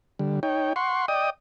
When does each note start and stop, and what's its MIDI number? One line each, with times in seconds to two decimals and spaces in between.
0.19 0.40 50
0.19 0.40 55
0.43 0.73 63
0.43 0.73 73
0.43 0.73 79
0.76 1.06 78
0.76 1.06 84
0.76 1.06 85
1.08 1.30 74
1.08 1.30 75
1.08 1.30 79
1.08 1.30 87